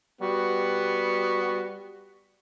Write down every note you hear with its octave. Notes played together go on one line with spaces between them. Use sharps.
G3 B3 F#4